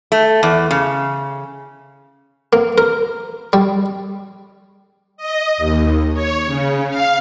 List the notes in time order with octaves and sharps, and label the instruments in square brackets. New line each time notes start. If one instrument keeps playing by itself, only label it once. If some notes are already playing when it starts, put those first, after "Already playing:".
[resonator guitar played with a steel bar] A3
E2
C#3
[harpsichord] A#3
A#4
G3
[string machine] D#5
D#2
C#5
C#3
F5